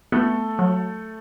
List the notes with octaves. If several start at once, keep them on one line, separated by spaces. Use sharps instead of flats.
A3 B3 A4
F#3